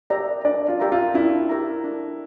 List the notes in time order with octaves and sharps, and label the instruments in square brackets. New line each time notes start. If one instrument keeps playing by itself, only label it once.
[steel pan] G4 A#4 E5 A#5 [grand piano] D5
[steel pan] D4 [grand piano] D5
[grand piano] F4
[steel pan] G4 A#4 E5 A#5
[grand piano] F4
[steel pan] D4 [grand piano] E4
[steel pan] G4 A#4 E5 A#5
D4